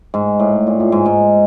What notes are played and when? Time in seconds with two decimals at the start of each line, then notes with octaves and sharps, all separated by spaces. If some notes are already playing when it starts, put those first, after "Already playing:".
0.14 G#2
0.40 A2
0.67 A#2
0.80 A2
0.92 G#2
1.06 G#2